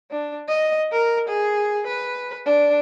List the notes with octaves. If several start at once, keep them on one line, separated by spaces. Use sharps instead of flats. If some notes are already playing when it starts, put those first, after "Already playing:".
D4
D#5
A#4
G#4
B4
D4